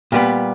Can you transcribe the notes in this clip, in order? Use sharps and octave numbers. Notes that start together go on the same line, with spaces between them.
A#2 G3 B3